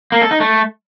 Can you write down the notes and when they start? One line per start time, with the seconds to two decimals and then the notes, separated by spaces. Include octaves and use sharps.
0.12 A#3
0.21 A4
0.31 D#4
0.40 A3